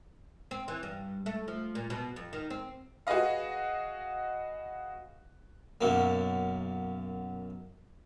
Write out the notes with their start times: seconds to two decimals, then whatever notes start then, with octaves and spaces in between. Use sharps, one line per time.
0.51 C4
0.68 E3
0.83 G2
1.26 A3
1.48 F3
1.75 A#2
1.90 B2
2.16 F2
2.33 D#3
2.50 C4
3.07 F#4 G#4 B4 D#5 F5
5.81 B1 F#2 A#3